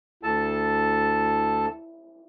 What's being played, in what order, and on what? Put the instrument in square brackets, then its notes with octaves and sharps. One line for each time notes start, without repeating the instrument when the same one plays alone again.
[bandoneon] D2 A4 A5 [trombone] E4